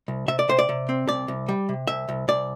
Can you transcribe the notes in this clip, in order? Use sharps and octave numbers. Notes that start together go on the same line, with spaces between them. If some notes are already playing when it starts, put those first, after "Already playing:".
C2
C3 E5
D5
C3 C5
D5
C3
C4
C2 D5
C2
G3
C3
C2 E5
C2
C2 D5